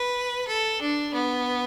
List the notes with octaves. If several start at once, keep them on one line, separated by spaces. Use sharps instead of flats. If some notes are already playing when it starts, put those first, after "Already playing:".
Already playing: B4
A4
D4
B3